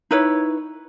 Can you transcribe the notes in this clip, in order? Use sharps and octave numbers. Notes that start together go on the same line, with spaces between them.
D#4 E4 B4 C#5